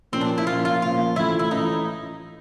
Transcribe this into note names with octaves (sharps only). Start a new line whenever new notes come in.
A#2 F3 A#3 C4 C#4
D4
E4
A#2 F3 A#3 C#4 F4
F4
A#2 F3 A#3 C#4 F4
A2 E3 A3 C#4 E4 F4
E4
A2 E3 A3 C#4 D#4 F4